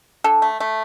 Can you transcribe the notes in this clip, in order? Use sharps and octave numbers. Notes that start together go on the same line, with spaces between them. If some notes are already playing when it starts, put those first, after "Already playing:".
D3 A4
A3
A3